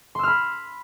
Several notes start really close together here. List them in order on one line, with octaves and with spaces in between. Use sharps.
C6 E6 F6 B5